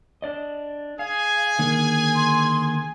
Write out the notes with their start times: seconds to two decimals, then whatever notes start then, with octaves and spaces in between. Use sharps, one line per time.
0.22 D4 D5 D#5
0.99 G#4 F5 G#5
1.59 D3 D#3 A#3
2.16 C6